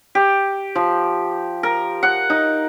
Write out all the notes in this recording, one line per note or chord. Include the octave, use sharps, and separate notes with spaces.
G4
F3
A#4
F#5
D#4